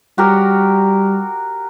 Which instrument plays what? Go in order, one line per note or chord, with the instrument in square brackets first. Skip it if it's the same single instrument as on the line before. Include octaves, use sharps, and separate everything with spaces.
[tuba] G3 [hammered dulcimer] F#4 G4 A#4